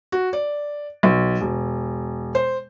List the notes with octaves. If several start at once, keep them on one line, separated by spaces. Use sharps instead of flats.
F#4
D5
B1
E1
C5